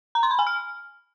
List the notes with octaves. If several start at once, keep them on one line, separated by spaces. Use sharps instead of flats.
A#5
C6
B5
G#5
F6